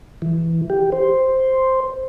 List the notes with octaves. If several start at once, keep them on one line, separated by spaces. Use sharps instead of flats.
E3
G4
C5